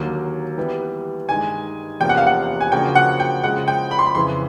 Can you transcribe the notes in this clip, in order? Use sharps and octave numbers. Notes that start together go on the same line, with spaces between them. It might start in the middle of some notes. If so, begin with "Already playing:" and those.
Already playing: D#2 D3 F#3 A#3
E3 G3 B3
G2 D#3 G#3 G#5
E2 C3 F3 A#3 C#4 G5
F#5
F5
F#5
G#5
C#3 F3 A#3 D4 F#4 G5
F#5
G5
C#3 F3 G#3 F#5
G5
B5
C6
B5
F2 C#3 E3 C6